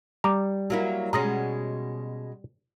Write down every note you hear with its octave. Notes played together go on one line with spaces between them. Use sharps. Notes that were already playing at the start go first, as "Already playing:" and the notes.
G3 A#5 D6
F#3 A#3 E4
B2 G#3 C#4 A#5 D#6 A#6